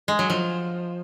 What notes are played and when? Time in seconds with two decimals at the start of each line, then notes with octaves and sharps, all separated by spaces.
0.08 G#3
0.19 F#3
0.30 F3